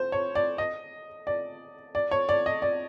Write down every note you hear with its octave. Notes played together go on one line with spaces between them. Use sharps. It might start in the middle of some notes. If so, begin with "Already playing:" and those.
Already playing: C5
C#5
D5
D#5
D5
D5
C#5
D5
D#5
D5